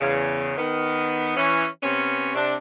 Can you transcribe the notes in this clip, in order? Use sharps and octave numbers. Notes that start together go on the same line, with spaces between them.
E2 C#3
D#3 B3
E3 C#4
C3 B3 C#4
C3 D4